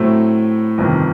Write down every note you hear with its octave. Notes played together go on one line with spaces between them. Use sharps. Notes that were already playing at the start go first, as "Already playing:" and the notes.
Already playing: A2 F#3 A3 C4
G1 F2 C3 D#3